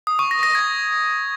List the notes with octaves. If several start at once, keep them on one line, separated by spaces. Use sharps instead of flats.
D#6
C#6
A#6
A#6
G#6